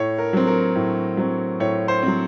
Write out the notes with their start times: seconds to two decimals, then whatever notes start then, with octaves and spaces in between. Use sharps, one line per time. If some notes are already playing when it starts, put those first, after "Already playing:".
Already playing: A2 C#5
0.18 A#4
0.33 F#3 C4
0.47 A#4
0.75 A2
1.17 F#3 C4
1.60 A2 C#5
1.88 C5
2.03 F#3 C4